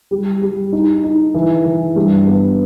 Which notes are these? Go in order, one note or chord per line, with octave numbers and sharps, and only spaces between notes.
G3
G3
D#4
D#4
E3
E3
G2
B3